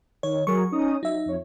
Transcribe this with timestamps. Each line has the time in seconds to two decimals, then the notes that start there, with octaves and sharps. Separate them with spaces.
0.23 D#3 C#5
0.47 F#3 G#4 A#4 C#6
0.72 C#4 D#4 D#6
1.03 F#3 D#4 E5
1.26 F2 C#5